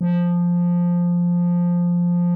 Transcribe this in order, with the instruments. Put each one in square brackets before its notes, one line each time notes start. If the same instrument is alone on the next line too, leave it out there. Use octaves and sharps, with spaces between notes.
[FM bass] F3